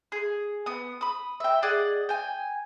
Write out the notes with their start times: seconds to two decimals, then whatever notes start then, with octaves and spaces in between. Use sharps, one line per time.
0.12 G#4
0.66 B3 D#6
1.01 B5 D#6
1.40 E5 G5
1.63 G#4 D5 D#5 F#5
2.09 G5 G#5